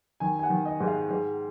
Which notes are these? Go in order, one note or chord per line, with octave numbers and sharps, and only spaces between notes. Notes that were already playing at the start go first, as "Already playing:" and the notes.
D#3 G#5
G#5
F#5
D#3
D#5
G#2
F5
G#2